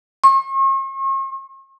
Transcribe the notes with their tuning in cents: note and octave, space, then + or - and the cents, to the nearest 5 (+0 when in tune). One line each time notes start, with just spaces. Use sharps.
C#6 -45